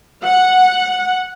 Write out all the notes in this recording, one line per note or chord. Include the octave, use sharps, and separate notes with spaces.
F#5